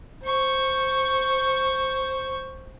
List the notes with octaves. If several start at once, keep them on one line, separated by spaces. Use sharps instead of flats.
C5 C#6